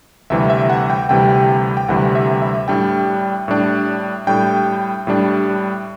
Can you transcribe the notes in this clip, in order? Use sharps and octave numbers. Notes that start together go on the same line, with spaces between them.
D2 C3 E3 G3 E5
E5
F#5
G5
D2 C3 E3 G3 G5
G5
D2 C3 E3 G3 F#5
E5
E5
A2 G3 D4 G5
A2 G3 D4
A2 G3 D4 G5
A2 G3 D4